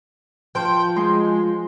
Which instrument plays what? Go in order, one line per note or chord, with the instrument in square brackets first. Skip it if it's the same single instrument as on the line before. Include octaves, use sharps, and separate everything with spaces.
[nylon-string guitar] F3 [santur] C5 [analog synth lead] G5
[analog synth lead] G#3 [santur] C6